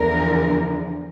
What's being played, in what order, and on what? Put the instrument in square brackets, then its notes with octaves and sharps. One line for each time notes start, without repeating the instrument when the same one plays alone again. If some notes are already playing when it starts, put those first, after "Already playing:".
Already playing: [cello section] E2 D3 F3 A#4